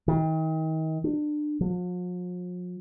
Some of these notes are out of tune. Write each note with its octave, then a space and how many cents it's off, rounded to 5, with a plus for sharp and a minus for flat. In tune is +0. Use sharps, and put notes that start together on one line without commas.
D#3 +35
D4 +30
F3 +45